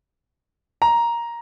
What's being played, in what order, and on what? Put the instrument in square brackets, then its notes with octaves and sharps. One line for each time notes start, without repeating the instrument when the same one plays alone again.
[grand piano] A#5